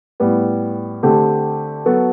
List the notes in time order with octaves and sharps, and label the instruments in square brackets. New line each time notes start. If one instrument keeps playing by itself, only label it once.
[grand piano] A2 G3 B3
D3 A3 C4 G4
F#3 B3 F#4 A4